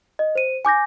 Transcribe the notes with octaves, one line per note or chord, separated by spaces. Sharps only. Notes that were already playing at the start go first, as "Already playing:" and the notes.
D#5
C5 D#7
G#5 D6 G6 A#6